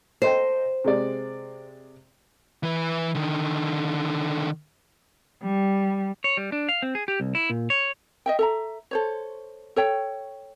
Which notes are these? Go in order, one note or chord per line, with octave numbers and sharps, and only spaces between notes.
A4 C5 D#5 G5
C3 G#3 D5
E3 B4
D3 D#3
G3
C#5
G3
D4
F5
C4
G#4
G4
C2
E4
A#2
C#5
D#5 E5 G5
A4 E5 A#5
A4 C5 C#5
A4 C#5 G5